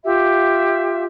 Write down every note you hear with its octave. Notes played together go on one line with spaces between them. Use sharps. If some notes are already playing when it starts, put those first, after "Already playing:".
F4 G4 E5